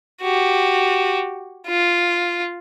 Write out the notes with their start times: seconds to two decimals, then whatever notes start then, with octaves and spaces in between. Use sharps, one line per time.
0.21 F#4 G4
1.67 F4